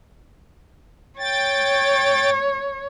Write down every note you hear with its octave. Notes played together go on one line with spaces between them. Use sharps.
C#5 G5 A6